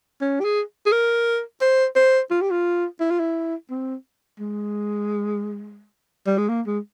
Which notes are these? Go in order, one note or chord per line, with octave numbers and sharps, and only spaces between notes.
C#4
G4
G#4
G#4
A#4
C5
C5
F4
G4
F4
E4
F4
E4
C4
G#3
G3
G#3
A#3
G#3